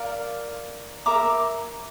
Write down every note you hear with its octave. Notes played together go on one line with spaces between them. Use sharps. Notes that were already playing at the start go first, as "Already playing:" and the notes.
Already playing: A#4 D5 F5
A#4 E5 A#5 D6